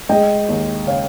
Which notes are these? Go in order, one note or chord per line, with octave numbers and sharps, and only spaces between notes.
G#3 D#5 G5
D#2
C#3 C#5 F5